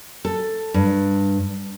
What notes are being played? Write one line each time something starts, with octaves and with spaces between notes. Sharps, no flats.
A4
G2